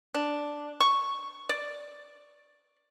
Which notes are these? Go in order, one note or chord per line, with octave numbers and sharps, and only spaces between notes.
D4
C#6
D5